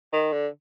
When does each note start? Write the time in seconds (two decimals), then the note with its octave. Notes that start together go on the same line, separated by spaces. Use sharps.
0.13 D#3
0.33 D3